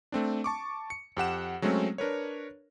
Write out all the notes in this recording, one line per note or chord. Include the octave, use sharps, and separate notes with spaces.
A3 C4 D4
A5 C#6 D6
C#7
F2 G4 F#5 E7
F#3 G#3 A3 C4 C#4
D4 A#4 B4 C#5